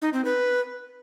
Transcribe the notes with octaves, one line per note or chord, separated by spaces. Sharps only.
D#4
C4
B4